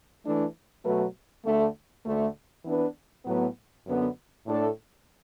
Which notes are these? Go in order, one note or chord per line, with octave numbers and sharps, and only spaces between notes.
E3 A3 D4
B2 F#3 A3 F#4 B4
D2 D3 A3
D2 D3 A3
E3 B3 D4 B4
A2 F#3 B3
F#2 D3 B3
A2 A3 D4 A4